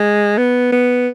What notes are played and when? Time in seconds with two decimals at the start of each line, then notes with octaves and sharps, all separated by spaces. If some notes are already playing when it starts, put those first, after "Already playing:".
Already playing: G#3
0.38 B3
0.72 B3